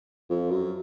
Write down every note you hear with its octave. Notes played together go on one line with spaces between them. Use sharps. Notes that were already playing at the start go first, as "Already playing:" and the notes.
F2
F#2